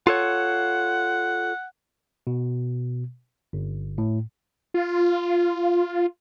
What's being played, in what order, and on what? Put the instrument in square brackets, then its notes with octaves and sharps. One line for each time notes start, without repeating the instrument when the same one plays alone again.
[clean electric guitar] F4 A4 C#5 [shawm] F#5
[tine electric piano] B2
G1
A2
[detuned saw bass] F4